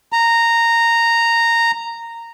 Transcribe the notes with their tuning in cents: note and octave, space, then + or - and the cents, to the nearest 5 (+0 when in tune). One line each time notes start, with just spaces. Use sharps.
A#5 -10